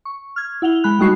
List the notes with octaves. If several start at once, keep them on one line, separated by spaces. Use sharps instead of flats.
C#6
F6 G#6
E4 F#5 F7 G7
G#3 B5 F#6
G3 A3 D#4 F#4 C#6 C7